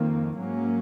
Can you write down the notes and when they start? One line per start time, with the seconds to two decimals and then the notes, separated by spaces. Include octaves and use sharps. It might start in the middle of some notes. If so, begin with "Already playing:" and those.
Already playing: F2 D#3 A#3
0.35 G#2 F#3 A#3 C#4